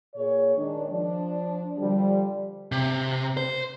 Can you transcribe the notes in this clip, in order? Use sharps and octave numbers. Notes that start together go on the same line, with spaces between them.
A#2 G#4 C#5
D#3 G#3 D4
F3 D4
D3 F3 G3
C3
C5